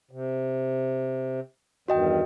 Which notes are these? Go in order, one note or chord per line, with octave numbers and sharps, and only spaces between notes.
C3
E2 G2 D#3 F#4 D#5 G5